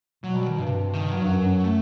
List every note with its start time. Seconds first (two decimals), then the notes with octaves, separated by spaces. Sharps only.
0.24 B2 F#3
0.36 G3
0.47 D#3
0.58 G2 C3
0.94 D#3
1.11 F#3
1.23 G2
1.29 F#2
1.64 A3